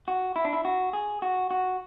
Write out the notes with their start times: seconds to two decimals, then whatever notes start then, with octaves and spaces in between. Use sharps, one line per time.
0.08 F#4
0.36 E4
0.45 D4
0.53 E4
0.65 F#4
0.93 G#4
1.22 F#4
1.51 F#4